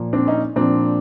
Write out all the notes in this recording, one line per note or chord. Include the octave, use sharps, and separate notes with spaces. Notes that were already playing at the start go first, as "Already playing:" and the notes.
Already playing: A#2 F3
C4 D4
C#4 D#4
A#2 F3 C4 D4